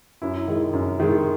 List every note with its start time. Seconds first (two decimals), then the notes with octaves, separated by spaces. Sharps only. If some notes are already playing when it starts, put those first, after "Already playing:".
0.22 F#2 E4
0.48 D#3 G#3
0.73 F#2
1.00 D#3 G#3